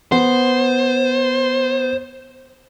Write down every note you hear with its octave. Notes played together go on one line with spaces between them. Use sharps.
B3 C5